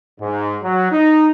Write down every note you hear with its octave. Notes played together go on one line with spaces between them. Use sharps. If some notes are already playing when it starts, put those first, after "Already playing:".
G#2
F#3
D#4